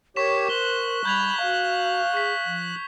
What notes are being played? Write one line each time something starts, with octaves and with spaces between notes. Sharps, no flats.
G4 A#4 C#5 C#6 B6 E7
C5 F#6 G7
G3 B5 G6 G#6 F7
F#4 F5
G#4 C#6 B6
F3